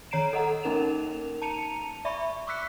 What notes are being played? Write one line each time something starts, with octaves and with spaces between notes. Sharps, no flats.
D#3 C#5 A#5 C7 D7 E7
A4 D#5 F#5 A#5
A#3 C#4 D#4 A#4 E7 F7
A5 A#5 C#7 D#7 F7
D5 E5 B5 C#6
C#6 D6 E6 F#6 B6 C#7